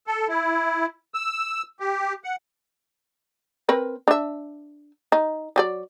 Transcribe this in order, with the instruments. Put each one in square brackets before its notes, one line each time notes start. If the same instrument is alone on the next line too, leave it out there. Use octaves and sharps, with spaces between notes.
[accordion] A4
E4
E6
G4
F#5
[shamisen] C4 A#4 B4
D4 E5
D#4
F#3 G4 D5